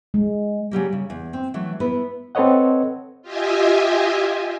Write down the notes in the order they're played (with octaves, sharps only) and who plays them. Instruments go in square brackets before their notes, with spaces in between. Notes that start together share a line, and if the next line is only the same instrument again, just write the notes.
[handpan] G#3
[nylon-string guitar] C#3 F#3 G3 A#3
C#3
E2
C4
E3 F#3 A3
B3 E4 A#4 B4
[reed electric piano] C4 A4 B4 C#5 D#5 F#5
[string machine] F4 G4 D#5 E5 G#5